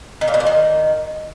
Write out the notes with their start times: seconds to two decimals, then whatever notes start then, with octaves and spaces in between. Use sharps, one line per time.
0.21 D#3
0.28 A#2
0.34 B2
0.40 A#2
0.46 D#3